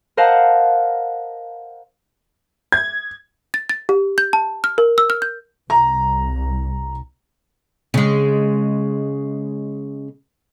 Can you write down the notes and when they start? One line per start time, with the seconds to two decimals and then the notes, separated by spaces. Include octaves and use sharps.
0.17 A#4 C5 D#5 F5 F#5 A5
2.72 G#6
3.54 A6
3.69 A6
3.89 G4
4.18 G6
4.33 A5
4.64 F6
4.78 A#4
4.98 E6
5.10 F6
5.22 G6
5.70 C2 A#5
7.94 C#3 G#3